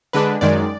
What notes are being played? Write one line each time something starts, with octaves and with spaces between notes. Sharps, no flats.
D3 G#3 D4 B4
F#2 D#3 G#3 D5